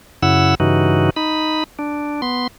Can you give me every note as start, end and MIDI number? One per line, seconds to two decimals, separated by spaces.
0.23 0.55 42
0.23 0.55 49
0.23 0.55 64
0.23 0.55 78
0.23 0.55 88
0.60 1.10 43
0.60 1.10 49
0.60 1.10 52
0.60 1.10 63
0.60 1.10 66
1.16 1.64 63
1.16 1.64 83
1.79 2.21 62
2.22 2.47 59
2.22 2.47 84